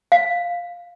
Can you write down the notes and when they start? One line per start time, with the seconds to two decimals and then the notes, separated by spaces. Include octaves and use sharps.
0.12 F5